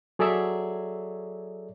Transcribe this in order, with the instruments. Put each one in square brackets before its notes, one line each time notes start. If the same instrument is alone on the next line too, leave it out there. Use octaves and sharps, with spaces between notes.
[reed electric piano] F#3 G#4 A4 C#5 D5 E5